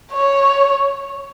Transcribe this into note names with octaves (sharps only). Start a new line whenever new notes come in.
C#5